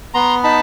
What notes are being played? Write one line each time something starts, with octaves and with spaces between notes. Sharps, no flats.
B3 A#5 C6
D#4 A5 B5